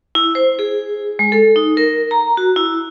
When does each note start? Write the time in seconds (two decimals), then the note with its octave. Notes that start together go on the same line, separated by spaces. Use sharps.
0.15 E4
0.35 C5
0.59 G#4
1.19 G#3
1.32 A4
1.56 D#4
1.77 A#4
2.11 A#5
2.37 F#4
2.56 E4